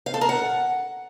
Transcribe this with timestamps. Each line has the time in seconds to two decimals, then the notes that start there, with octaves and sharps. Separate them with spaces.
0.06 F5
0.14 A4
0.21 A#4
0.29 F#5